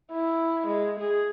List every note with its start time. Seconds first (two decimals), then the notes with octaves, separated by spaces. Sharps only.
0.12 E4
0.67 G#3
1.00 G#4